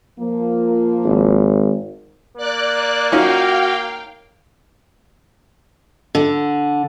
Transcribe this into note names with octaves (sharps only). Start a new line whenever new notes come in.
F3 A#3
G#1
A#3 D5 F#6
C#4 D#4 F4 F#4 F5 G5
D3